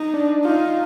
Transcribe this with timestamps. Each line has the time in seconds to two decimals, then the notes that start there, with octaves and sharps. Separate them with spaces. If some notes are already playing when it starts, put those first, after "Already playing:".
Already playing: D#4
0.14 D4
0.45 D#4 F4